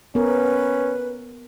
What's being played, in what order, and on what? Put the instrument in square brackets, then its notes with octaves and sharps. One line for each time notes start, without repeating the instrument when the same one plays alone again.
[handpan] B3 A#4 [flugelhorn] C#4 [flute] B4